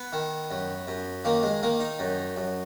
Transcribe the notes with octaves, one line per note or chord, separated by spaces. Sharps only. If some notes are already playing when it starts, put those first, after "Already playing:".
Already playing: B3
D#3
F#2
F#2
D#3 A#3
G#3
D#3 A#3
D#4
F#2
F#2